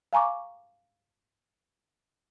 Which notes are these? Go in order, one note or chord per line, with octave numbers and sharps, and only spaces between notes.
F5 G#5 A#5 C#6 D6